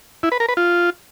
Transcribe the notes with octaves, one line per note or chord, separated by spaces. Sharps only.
E4
B4
A#4
B4
F4